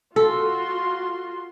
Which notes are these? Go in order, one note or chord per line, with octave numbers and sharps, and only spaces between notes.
F4 F#4 A4 C6